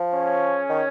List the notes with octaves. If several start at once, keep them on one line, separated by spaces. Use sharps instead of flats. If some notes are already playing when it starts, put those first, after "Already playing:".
Already playing: F3
C#4 G#4 C#5
D#3